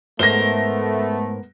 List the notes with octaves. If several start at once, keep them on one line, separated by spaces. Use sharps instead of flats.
G#2 A3 B3 A#4 C5 A#6 G7